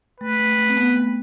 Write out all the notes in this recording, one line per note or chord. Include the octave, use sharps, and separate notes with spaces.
A3 B4
A3
A3
C4
B3
A3